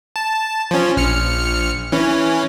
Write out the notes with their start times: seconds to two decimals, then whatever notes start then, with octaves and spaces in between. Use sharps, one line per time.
0.16 A5
0.71 F3 C#4
0.97 A#1 F6 C#7
1.92 E3 C#4